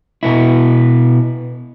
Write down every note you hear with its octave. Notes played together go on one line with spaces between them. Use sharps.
B2 B3 E4